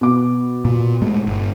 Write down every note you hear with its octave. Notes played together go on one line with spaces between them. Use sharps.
B2 D6
A#2
A#2 G#3 A3
G1